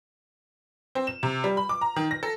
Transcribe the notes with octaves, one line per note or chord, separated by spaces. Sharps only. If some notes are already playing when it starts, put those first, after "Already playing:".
C4
E7
C3
G3
B5
D6
A#5
D#3
A#6
A4